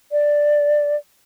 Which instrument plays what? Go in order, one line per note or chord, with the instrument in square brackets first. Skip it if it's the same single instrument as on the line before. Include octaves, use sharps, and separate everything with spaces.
[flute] D5